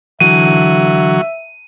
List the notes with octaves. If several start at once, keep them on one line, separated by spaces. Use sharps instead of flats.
D3 E3 F#3 E5 D#7